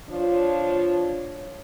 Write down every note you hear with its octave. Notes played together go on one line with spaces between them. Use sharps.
F3 D4 F4 C#5